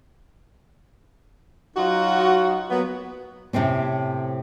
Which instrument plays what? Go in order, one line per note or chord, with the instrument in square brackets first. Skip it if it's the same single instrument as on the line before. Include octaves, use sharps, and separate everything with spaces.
[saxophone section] F#3 D#4 F4 F#4
F#3 A#3 B3
[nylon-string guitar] A2 C3 A3 C4 C#4